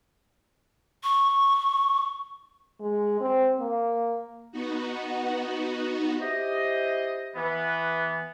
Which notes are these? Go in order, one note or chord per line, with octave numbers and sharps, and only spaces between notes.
C#6
G#3
C4
A#3
B3 D#4 F#4
E4 G4 C5 D#5
E3 B3